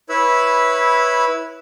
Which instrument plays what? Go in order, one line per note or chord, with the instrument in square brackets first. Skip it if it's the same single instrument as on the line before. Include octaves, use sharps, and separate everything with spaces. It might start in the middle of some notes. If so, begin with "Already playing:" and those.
[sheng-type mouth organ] E4 B4 C#5 B5 E6